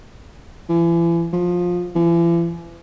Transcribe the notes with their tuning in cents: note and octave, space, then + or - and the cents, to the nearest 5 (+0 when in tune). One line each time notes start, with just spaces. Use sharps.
E3 +40
F3 +20
E3 +45